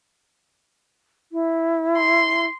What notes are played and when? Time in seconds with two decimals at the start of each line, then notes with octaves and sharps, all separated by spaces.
1.32 E4
1.97 C6